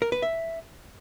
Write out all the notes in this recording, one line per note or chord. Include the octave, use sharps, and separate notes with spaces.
A#4
B4
E5